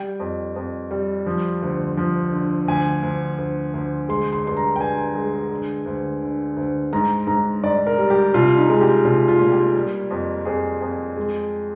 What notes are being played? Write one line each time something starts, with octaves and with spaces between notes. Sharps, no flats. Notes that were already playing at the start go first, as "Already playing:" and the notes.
Already playing: G3 G5
F2
F2
G3
F3
D2
F3
D3
D2 G#5
D2
D2
D2
G#3 C6
C6
G2 C6
A#5
G5
G2 G#5
G#3
D3
D2
D3
D2
G#2 A#5
G#2 A#5
G#2 D5
A#4
G3
G4
C2 F4
D#4
G#3
G4
C2 F4
F4
A#2
G4
G3
F2
F2 G#4
F2
G#3